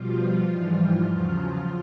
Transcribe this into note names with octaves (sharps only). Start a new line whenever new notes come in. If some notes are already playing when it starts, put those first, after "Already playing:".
Already playing: B2 F3 G3 F4
G#2 E3 G3
E2 C#3 F#3